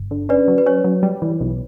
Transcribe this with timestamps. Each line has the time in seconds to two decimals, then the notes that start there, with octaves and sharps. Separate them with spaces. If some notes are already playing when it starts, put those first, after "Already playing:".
Already playing: G1
0.11 D3
0.29 C#4 B4 D5
0.48 F#3
0.58 B4
0.66 C#4 C#5
0.84 F#3
1.03 G3
1.22 E3
1.41 B1